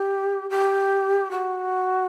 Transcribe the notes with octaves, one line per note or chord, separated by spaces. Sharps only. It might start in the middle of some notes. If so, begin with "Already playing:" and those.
Already playing: G4
G4
F#4